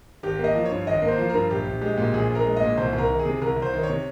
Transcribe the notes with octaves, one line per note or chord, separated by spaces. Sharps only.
G#1 G4
A#3
D#5
F3
C#5
G2
G#1 D#5
A#3
C5
F3
G2 A#4
A#1 G4
A#1
G#3 G4
A#2
A#1 G#4
A#1 A#4
G#3
A#2 D#5
C2 C5
C2
A#4
D#3
G#4
C3
C2 A#4
C2
C5
D#3
C#5
C3